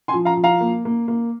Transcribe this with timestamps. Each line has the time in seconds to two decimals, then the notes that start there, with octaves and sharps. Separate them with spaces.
0.08 G#5 C6
0.14 F3
0.25 F5 A#5
0.37 F3
0.44 F5 A#5
0.61 A#3
0.85 A#3
1.08 A#3